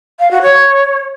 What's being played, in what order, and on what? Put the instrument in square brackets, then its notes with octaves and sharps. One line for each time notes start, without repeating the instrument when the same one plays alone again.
[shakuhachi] F5
F#4
C#5